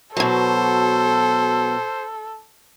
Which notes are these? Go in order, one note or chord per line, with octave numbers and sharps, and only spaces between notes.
B2 F#3 A4 C5